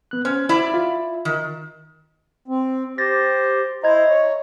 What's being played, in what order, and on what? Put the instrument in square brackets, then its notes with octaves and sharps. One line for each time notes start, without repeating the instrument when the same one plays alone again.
[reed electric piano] B3 F#6
[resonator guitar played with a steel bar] C#4 [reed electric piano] C5
[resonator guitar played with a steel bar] E4 D5 E5
[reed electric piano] F4
[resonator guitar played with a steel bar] D#3
[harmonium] C4
[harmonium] G4 [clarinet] C5 [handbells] A6 A#6
[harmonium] E4 C5 [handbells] D#5 G#6 [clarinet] A#5
[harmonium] C#5